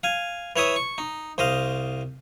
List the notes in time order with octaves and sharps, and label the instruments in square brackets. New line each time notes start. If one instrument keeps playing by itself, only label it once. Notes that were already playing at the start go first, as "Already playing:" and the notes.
[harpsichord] F5 G#5
E3 C#5 E5 D#6
C#6
D#4
C2 C5 D#5 F5